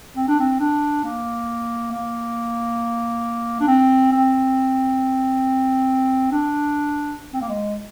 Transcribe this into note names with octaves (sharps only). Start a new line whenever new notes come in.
C4
D4
C4
D4
A#3
A#3
D4
C4
C4
D4
C4
A#3
G#3